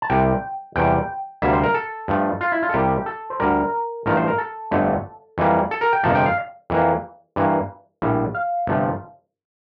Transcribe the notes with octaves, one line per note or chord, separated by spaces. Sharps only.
A5
C2 C3 G3 G5
E2 C3 G3 G5
D2 C3 G3 A#3 E5
C5
A#4
A4
G2 F3 A3
F4
E4
F4
A4
C2 C3 G3 A#3 G4
A4
C5
D2 D3 G3 A#4
A1 G2 F3 A3 A#4
C5
A#4
A4
G1 F2 D3 A3
F2 E3 G3 A#3
A4
A#4
G5
G1 F2 C3 F3 A#3 A5
G5
F5
F2 E3 A#3
G2 E3 A#3
A#1 A2 G3
F5
G1 C3 F3 A3